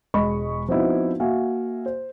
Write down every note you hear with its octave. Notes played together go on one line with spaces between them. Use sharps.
E1 G#3 D#5 B5 C#6
F3 B3 C4 D#4 E4 F#4
A#3 F#4 E5 F5 G#5
C5